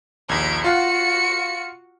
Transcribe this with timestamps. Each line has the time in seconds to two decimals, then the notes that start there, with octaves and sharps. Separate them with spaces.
0.29 A#1 D#2 G#6 D7
0.64 F4 F#4 F5 F#5 C#7